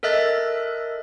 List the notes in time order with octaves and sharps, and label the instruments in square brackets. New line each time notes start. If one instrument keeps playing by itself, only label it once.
[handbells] A4 A#4 D#5 E5 F#6 A6